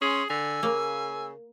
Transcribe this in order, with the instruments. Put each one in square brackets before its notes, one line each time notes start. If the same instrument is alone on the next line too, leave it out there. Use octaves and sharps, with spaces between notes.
[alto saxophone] C#4 [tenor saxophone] G#4 [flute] C6
[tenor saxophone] D3 [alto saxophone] G#5 [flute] E6
[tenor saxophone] C#3 [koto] A#3